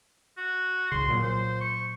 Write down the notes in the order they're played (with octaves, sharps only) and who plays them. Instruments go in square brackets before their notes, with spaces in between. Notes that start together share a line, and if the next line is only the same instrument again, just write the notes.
[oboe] F#4
[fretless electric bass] C2 C#3 [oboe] C6
[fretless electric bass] A#2 F#3
[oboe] C5
C#6